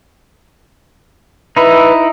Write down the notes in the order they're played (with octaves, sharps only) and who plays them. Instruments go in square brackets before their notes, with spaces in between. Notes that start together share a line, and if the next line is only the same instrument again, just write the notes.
[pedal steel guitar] D#4 E4 [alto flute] B4